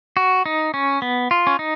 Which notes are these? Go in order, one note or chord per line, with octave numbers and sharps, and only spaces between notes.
F#4
D#4
C#4
B3
F4
C#4
D#4